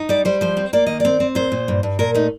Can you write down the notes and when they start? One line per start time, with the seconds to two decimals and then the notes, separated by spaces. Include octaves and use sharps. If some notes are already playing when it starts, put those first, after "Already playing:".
Already playing: D#4
0.09 G3 D5
0.25 G3 C5
0.41 F3 C5
0.57 C4
0.73 A#3 D5
0.86 D#3 D#5
1.00 C4 D5
1.20 C4
1.35 A#2 C5
1.52 A#2
1.68 G2
1.83 G2
1.99 A#2 A#4
2.14 A3 D#4